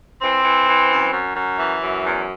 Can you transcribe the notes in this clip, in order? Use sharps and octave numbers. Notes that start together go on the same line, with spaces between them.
E3 C4
E3
E3
F#2
F#2
F#2
E3
F#2
E2